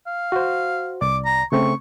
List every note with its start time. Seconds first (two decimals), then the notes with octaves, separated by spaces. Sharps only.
0.07 F5
0.32 F#4 C5
1.01 C2 D5 D6
1.25 A#5
1.52 C#3 A3 C4 C#6